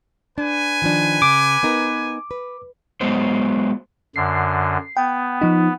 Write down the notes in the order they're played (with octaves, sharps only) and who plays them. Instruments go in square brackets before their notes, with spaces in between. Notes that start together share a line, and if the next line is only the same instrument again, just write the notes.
[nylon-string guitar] D4 [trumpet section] B4 G#5
[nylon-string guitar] D#3 F3 D4
[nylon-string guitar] C#3 [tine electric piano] D6
[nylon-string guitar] B3 D#4 A#4
B4
[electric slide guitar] F#3 G#3 B3 C5
[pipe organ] F#2 D3 [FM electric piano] C7
[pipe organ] B3 [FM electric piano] G5
[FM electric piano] F3 D#4